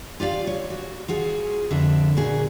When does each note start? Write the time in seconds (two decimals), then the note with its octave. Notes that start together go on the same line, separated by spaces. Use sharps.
0.20 F4 G4 D5 F5
0.47 C#5
0.70 F#4
1.08 F4 F#4 G#4
1.70 F2 D3 D4 E5
2.17 A#2 F#4 G#4